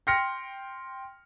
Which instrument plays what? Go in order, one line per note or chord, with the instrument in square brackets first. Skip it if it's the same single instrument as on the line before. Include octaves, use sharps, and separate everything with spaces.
[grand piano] G5 C6 F6 A#6 C#7